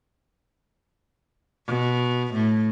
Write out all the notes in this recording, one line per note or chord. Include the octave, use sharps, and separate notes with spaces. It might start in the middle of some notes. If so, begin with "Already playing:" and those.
B2
A2